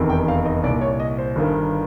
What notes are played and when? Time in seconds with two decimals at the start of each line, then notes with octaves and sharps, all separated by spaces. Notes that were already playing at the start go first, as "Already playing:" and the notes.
Already playing: F1 E2 C3 D#3
0.10 G5
0.28 F5
0.45 D#5
0.63 C2 D5
0.68 A#2
0.81 C#5
1.00 D#5
1.18 C5
1.36 G1 G2 D#3